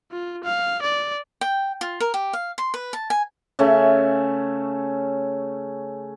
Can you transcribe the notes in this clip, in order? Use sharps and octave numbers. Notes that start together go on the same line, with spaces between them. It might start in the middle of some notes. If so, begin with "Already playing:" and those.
F4
F5
D5
G5
F4
A#4
G4
F5
C6
B4
A5
G#5
C#3 A3 C#4 E5